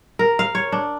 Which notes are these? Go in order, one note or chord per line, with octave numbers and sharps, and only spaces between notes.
A#4
F5
C#5
D4